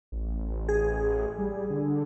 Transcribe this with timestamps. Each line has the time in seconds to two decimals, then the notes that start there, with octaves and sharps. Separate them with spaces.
0.12 A1
0.69 G#4
1.38 G3
1.70 D3